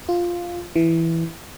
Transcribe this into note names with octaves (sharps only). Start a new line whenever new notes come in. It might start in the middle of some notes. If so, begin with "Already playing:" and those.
F4
E3